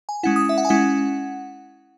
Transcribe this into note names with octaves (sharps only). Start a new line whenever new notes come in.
G#5
G#3 C#4 E4 F#5
D#6
E5
F#5
G#5
G#3 C#4 E4 F#5